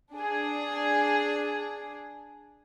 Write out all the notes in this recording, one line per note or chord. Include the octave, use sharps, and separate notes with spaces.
D4 G#4